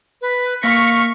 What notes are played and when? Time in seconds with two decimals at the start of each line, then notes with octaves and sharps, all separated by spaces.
0.22 B4
0.63 A#3 F5 C#6 A#6 B6